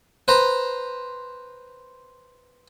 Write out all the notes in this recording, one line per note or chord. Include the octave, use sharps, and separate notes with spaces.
B4 C5 A#5